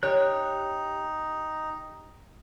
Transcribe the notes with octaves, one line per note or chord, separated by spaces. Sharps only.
D#4 G4 C#5 F#6